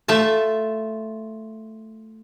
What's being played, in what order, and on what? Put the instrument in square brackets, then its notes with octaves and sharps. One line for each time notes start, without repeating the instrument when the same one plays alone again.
[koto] A3 F4 E5 A5